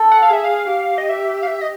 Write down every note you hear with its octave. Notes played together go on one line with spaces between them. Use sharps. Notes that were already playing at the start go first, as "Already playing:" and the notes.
Already playing: A4
F#5
F5
G#4 E5
F5
G4
D#5
E5
F5
E5
D#5